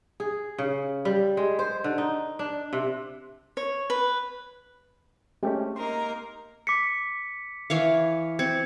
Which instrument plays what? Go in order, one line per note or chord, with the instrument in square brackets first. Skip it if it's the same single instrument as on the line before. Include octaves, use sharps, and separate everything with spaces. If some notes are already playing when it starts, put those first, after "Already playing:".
[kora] G#4
C#3
G3
G#3
C5
D3
D#4
D4
C3
[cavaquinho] C#5
B4
[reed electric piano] G#3 A3 C#4 [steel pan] C4 G4
[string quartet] A#3 D#4 A#4 [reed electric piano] C6
[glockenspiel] D6 B6 C#7
[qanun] E3 C#5 F5 [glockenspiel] C#7
[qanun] C4 [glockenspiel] G#6 C#7